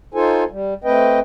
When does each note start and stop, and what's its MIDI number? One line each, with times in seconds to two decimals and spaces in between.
0.14 0.44 63
0.14 0.44 65
0.14 0.44 69
0.14 0.44 72
0.14 0.44 80
0.51 0.74 55
0.84 1.20 57
0.84 1.20 60
0.84 1.20 71
0.84 1.20 75
0.84 1.20 79